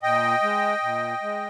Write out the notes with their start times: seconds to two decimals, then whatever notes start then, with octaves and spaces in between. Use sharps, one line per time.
0.02 A#2 D#5 G5
0.43 G#3
0.82 A#2
1.22 G#3